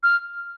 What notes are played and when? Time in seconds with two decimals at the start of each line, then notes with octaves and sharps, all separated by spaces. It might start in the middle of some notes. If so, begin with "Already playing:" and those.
0.03 F6